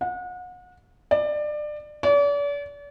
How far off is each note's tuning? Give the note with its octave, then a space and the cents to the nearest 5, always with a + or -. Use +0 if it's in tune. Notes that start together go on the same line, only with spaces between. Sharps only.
F#5 -35
D5 +25
D5 -40